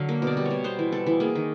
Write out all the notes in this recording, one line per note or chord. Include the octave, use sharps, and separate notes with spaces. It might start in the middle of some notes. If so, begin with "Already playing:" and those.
Already playing: D3 F#3 F5
A#3
B2 D5
G3
C#5
B2
B3 C5
E3
G3 A4
E3
A#3 G#4
D#3